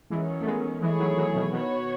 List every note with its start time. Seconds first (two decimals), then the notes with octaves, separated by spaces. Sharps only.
0.10 D#3 E3 F#3 G#3 C#4
0.41 A3
0.46 G#3 B3
0.81 E3 G#3 A3 E4 G#4 C#5
0.99 D#3 F#3
1.17 D#3 F#3
1.35 B2 D#3
1.52 B2 D#3 B3 F#4 C#5